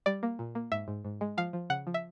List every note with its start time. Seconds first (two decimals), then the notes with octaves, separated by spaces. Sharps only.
0.06 G3 D5
0.23 A#3
0.39 A#2
0.55 A#3
0.72 G#2 E5
0.88 G#2
1.05 G#2
1.21 G#3
1.37 F3 F5
1.53 F3
1.70 C#3 F#5
1.87 F3
1.94 E5